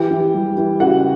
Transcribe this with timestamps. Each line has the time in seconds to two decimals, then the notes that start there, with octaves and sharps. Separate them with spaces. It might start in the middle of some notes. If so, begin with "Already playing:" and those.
Already playing: E3 G4 G5
0.11 E3
0.34 G3
0.57 E3
0.80 C#3 F#4 F#5